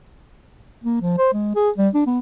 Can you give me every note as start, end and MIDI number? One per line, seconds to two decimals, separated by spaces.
0.84 0.98 58
1.02 1.18 53
1.18 1.29 72
1.33 1.55 56
1.55 1.70 68
1.78 1.88 55
1.94 2.02 62
2.06 2.19 59